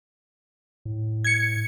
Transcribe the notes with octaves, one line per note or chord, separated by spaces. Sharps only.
A2
G#6 C#7